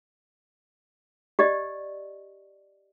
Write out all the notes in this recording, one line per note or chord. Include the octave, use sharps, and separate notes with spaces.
G4 D5 D#5